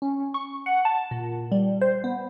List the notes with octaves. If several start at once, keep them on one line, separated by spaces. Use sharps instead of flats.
C#4
C#6
F#5
A5
A#2
G3
C5
B3